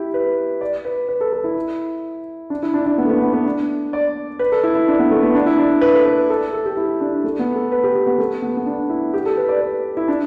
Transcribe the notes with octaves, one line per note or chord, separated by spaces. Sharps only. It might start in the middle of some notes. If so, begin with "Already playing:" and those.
Already playing: E4 G4
B4
D5
B4
B4
A4
A4
E4
D4
E4
D4
D4
B3
A3
B3
B3
B3
D4
D5
B4
A4
E4
E4
D4
B3
A3
B3
D4
E4
D4
B4
A4
B4
A4
A4
G4
E4
D4
A3
B3
A4
B4
G4
G4
B3
A3
B3
B3
D4
E4
G4
A4
B4
D5
B4
E4
D4